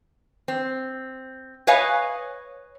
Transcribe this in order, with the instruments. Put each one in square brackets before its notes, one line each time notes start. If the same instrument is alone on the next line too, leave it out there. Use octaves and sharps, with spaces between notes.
[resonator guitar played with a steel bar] C4
B4 C#5 D#5 F5 G#5